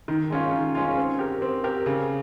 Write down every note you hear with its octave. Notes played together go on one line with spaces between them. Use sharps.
D#3
G#3 C#4 F4
D#3
G#3 C#4 F4
C4
G4 A#4
C4
G4 A#4
C#3